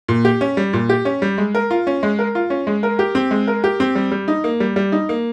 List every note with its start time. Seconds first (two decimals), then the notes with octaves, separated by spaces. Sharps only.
0.08 A#2
0.25 G4
0.41 C#4
0.57 G3
0.73 A#2
0.89 G4
1.05 C#4
1.22 G3
1.38 G#3
1.55 A#4
1.71 F4
1.87 C#4
2.03 G#3
2.19 A#4
2.35 F4
2.50 C#4
2.67 G#3
2.83 A#4
2.99 G4
3.15 C4
3.31 G#3
3.48 A#4
3.64 G4
3.80 C4
3.95 G3
4.11 G3
4.28 D#4
4.44 A#3
4.60 G3
4.76 G3
4.92 D#4
5.09 A#3